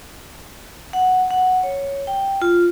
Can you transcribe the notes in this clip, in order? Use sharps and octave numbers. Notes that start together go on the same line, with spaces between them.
F#5
F#5
C#5
G5
F4